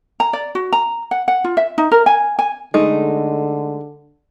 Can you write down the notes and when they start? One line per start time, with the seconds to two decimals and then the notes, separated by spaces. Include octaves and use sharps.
0.20 A#5
0.33 D5
0.55 F#4
0.73 A#5
1.11 F#5
1.28 F#5
1.44 F4
1.57 E5
1.78 D#4
1.92 A#4
2.06 G#5
2.39 G#5
2.74 D3 G#3 A3 D#4